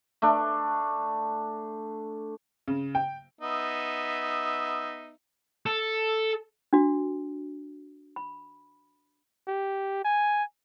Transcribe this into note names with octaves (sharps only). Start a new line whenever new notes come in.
A3 D4
C#3
G5
B3 D#4 E5
A4
D4 F#4
B5
G4
G#5